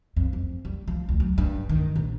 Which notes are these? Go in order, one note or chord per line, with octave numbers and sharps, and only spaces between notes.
F2
F2
G3
F3
D2
F#3
G2
D#3
A#1